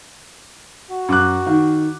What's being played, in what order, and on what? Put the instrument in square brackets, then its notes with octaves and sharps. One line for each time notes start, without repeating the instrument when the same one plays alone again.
[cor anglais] F#4
[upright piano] F#2 D6 F#6
D#3